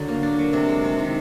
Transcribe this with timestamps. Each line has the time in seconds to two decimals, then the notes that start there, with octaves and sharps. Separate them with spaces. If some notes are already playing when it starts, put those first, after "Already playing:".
Already playing: D3 F#3
0.08 A#3
0.23 D4
0.39 F#3
0.53 C3
0.69 G#3
0.84 C3
0.99 D#3